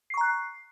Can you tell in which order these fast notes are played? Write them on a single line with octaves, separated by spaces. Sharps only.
C7 C#6 A#5 F#6